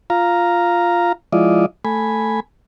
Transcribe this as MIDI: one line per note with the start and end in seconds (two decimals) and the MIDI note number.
0.10 1.12 65
0.10 1.12 77
0.10 1.12 82
1.33 1.66 53
1.33 1.66 56
1.33 1.66 64
1.33 1.66 65
1.33 1.66 74
1.33 1.66 75
1.85 2.40 57
1.85 2.40 80
1.85 2.40 83